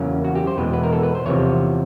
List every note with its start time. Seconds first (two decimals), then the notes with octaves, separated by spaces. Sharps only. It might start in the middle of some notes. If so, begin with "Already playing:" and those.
Already playing: E2 C#3 F#3 A#3 C#4
0.24 F#4
0.35 G4
0.47 C5
0.58 E2 B2 G#3 B4
0.73 B4
0.83 A#4
0.93 A4
1.03 B4
1.15 C5
1.26 E2 C3 F3 C#5